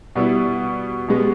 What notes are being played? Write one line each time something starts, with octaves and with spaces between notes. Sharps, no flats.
B2 G3 B3 E4
B2 G#3 B3 G4